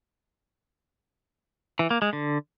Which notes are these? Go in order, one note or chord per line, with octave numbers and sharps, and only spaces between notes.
E3
A#3
G#3
D3